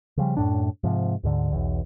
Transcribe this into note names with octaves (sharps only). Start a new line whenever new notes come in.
C#3 F3 G3
F#2 A2 D4
G#2 C3 F3
D2 G#2 D3
B1 E2